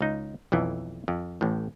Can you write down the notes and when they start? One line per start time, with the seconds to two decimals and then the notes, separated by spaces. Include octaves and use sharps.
0.01 C#2 D#4
0.52 B1 F2 E3
1.08 F2
1.41 A1 A2